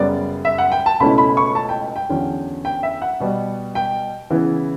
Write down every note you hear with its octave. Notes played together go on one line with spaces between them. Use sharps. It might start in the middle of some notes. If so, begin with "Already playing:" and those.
Already playing: F#2 C#3 G3 B3 D5
E5
F#5
G5
A5
C#2 B2 A3 C#4 E4 B5
B5
C#6
A5
G5
G5
E2 D3 F#3 C#4
G5
E5
F#5
B2 G3 B3
G5
C#3 E3 B3 E4